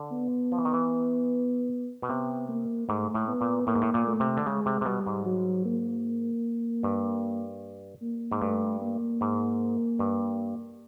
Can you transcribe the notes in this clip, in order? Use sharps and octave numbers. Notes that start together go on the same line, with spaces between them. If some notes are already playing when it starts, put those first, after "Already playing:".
Already playing: D3
B3
F3
E3
D#3
E3
B2
C3 B3
A#3
G#2 A3
A2
B3
A#2
A2 A#3
G#2
A2
A#2
A3
C3
D3
C#3 G#3
C3
C3
B2 G3
G#2
F#3
A#3
G2
A#3
G#2
G2 A3
A#3
G#2
G2